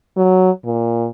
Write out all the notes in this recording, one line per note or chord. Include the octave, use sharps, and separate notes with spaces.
F#3
A#2